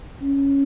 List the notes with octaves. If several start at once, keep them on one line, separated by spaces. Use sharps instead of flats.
C#4